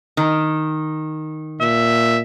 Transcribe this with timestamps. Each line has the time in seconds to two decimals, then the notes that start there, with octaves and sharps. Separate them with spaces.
0.17 D#3
1.61 A#2 E5